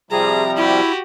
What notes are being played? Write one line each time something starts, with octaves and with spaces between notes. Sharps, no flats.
C3 F3 G3 G#4 A#5
E4 F#4 G4